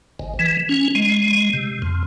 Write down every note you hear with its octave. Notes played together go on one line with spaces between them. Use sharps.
G#1
E3
C#4
G#3
C3
F2